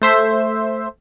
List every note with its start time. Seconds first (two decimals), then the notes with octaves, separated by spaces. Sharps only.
0.02 A3 C5 E5